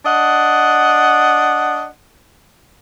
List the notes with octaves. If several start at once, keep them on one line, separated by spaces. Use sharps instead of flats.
D4 D#5 F#5